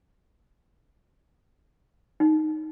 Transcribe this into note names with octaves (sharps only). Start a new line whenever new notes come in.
D#4